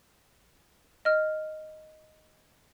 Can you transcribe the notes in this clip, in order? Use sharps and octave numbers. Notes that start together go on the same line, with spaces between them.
D#5 F6